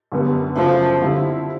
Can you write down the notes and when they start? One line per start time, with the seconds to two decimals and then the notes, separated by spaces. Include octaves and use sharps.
0.12 F#2 D3 G3 B3
0.56 F#2 C#3 F3 F#3 A3
1.01 D3 G3 C4 E4